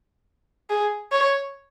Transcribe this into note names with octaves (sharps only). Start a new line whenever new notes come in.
G#4
C#5